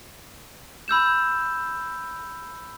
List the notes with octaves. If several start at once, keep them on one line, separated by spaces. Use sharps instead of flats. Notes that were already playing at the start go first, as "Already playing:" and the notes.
B5 E6 G6 E7